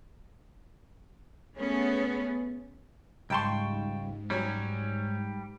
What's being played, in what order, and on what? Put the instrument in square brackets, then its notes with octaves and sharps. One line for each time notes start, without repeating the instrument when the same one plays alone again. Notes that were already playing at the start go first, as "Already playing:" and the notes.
[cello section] A3 B3 C#4 G#4
[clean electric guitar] C#2 G3 C6 [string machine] G#2 [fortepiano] G5 A5 C#6
[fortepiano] F#3 C#4 [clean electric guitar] G3